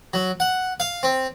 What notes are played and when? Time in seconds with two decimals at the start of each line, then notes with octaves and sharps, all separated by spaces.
0.14 F#3
0.40 F#5
0.80 F5
1.03 C4